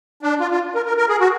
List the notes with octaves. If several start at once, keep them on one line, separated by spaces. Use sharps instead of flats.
D4
F4
F4
A#4
A#4
A#4
G#4
F#4